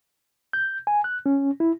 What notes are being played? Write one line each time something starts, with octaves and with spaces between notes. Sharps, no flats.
G6
G#5
F#6
C#4
E4